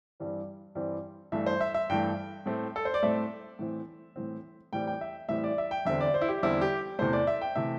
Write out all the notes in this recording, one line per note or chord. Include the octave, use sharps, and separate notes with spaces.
G2 E3 G3 C4
G2 E3 G3 C4
G2 E3 A3 E5
C5
E5
E5
G2 E3 A3 G5
A2 A3 C4
A4
C5
D5
A2 A3 C4 E5
A2 E3 C4
A2 E3 C4
A2 E3 G3 C4 G5
G5
E5
A2 E3 G3 C4 E5
D5
E5
G5
E2 D3 G3 C4 E5
D5
C5
E4
G4
E2 D3 G3 C4 E4
G4
E2 C3 E3 A3 C5
D5
E5
G5
C3 E3 A3 E5